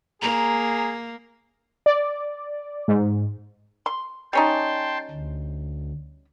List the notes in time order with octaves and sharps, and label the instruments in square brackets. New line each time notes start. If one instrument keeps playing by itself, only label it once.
[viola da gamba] A#3 [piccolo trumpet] G#4 [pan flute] A#5
[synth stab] D5
G#2
[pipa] C6
[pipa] G3 C#4 D#4 [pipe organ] G5 A5 C6
[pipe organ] D2